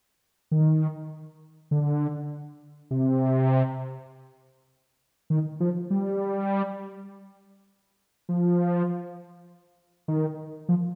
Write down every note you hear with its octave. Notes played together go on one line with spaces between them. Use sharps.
D#3
D3
C3
D#3
F3
G3
F3
D#3
F3